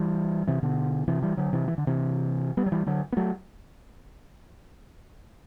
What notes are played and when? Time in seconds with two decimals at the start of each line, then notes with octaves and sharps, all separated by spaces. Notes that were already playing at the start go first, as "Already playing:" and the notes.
Already playing: E3 G3
0.47 C3 E3
0.63 B2 D3
1.08 C3 E3
1.22 E3 G3
1.37 D3 F#3
1.53 C3 E3
1.68 E3
1.78 D3
1.87 C3 E3
2.57 G3 B3
2.66 F#3
2.72 E3 G3
2.86 D3 F#3
3.12 B3
3.17 F#3 A3